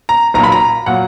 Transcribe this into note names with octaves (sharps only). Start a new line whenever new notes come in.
A#5
B1 A#2 F#3 A#3 A#5
B5
A#5
A#2 F#3 A#3 F#5